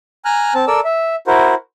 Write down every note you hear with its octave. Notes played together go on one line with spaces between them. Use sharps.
G#5 A#5 F6 F#6
C4 A5
A4 A#4 D5 E6
E5
E4 F#4 A#4 C5